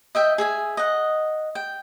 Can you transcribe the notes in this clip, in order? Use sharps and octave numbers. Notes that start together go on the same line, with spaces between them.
D#5 E5 G5
G#4 E5 G#5
D#5 F#5
G5